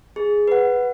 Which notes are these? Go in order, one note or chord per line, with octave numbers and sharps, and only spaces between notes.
G#4
B4 F#5